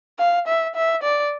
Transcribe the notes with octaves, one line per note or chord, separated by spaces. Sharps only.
F5
E5
E5
D5